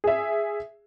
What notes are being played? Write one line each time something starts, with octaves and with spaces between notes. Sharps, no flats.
G#4 E5